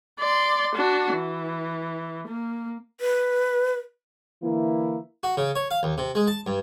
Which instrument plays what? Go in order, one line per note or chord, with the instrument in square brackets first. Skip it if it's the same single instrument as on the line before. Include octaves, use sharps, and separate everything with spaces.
[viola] D5 C6
D4 F#4
E3
A#3
[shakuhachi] B4
[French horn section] D3 E3 A#3 E4
[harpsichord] F#4
C#3
C#5
F5
D#2
C3
G#3
A5
G2